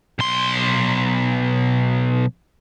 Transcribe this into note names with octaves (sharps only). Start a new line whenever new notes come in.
B1 C6